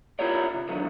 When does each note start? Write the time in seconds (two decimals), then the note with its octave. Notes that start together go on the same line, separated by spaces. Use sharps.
0.19 E4 F4 G4 A#4 C#5 D5
0.54 C3
0.68 B1 E2 D3 D#3 F#3